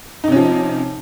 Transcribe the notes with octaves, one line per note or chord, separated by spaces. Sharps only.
C3 F3 C#4 D#4